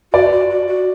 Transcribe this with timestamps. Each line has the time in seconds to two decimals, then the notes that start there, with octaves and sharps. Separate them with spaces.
0.13 F#4 D5
0.32 F#4
0.50 F#4
0.67 F#4